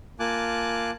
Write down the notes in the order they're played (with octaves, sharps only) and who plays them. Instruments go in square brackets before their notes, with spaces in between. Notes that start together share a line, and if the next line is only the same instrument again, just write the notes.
[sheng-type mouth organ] A#3 F4 G#5 A5 D6 F#6